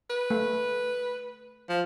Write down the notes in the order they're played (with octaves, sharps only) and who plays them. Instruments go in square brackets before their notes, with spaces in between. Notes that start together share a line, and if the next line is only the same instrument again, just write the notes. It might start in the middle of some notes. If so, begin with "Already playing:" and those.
[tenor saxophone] B4
[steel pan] A3
[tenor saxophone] F3